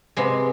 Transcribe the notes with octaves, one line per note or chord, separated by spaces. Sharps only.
C3 G#3 B3